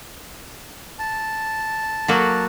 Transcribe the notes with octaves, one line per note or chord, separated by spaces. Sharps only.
A5
F#3 A#3 F#4